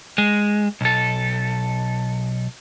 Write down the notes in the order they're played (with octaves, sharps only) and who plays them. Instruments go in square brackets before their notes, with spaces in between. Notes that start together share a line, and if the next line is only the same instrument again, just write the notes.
[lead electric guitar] G#3
B1 A4